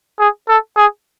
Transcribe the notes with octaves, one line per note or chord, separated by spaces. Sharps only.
G#4
A4
G#4